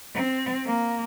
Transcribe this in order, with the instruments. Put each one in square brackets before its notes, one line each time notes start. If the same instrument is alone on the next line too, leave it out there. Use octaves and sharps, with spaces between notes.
[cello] C4
A#3